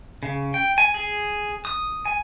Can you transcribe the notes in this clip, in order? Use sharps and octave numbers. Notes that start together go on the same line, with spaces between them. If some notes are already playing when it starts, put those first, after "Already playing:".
C#3
G5
G#5
G#4
D#6
G#5